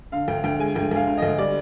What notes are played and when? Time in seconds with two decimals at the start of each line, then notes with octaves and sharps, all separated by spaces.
0.12 D3 F5
0.28 D2 G5
0.44 D2 G5
0.59 G#3 G#5
0.75 D2 G5
0.91 D2 F5
1.07 D3
1.17 D#5
1.22 D2
1.38 G3 D5